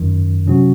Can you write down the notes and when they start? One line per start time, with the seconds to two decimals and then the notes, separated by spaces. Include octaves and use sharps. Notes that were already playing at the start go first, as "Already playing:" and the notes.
Already playing: G#1 F#2 D#3
0.47 C3 F#3 C#4 F#4